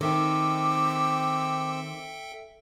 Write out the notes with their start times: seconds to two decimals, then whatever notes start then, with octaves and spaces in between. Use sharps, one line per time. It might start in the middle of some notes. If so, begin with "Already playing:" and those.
0.01 D#3 C4 A4 E5 G5 D6 E6